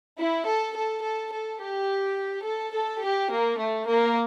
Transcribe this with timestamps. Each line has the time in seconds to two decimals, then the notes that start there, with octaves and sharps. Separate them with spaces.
0.19 E4
0.48 A4
0.75 A4
1.04 A4
1.33 A4
1.61 G4
2.46 A4
2.75 A4
3.04 G4
3.33 A#3
3.60 A3
3.89 A#3